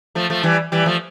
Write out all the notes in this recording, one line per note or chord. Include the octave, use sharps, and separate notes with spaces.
F3 A3
F3 A3
E3 G3
E3 G3
F3 A3